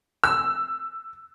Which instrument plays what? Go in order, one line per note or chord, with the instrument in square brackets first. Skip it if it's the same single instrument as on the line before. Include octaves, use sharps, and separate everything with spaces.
[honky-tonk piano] E6